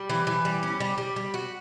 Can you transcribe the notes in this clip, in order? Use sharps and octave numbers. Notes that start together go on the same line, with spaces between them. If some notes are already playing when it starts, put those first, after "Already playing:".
Already playing: G3
E3
E3
G3
C#4
G3
G3
G3
F#4